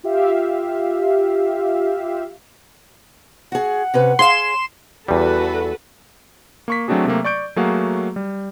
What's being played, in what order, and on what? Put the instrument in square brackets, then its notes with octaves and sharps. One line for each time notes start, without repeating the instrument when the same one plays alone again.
[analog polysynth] F4 G4 E5 F5
[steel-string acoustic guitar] F#4 G#4 [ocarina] F#5
[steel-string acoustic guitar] C3 C#4 B4
[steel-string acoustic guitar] G#4 C#5 F5 [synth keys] C6 E7
[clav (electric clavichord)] E2 G3 [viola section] F#4 A4 B4
[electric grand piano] A#3 C#6 B6
F#3 A3 C4 D4 F#4 G#4
C3 F#3 A3 A#3
D5 C#6 G6 D7
F#3 A3 A#3 F#4 G#4 F5
G3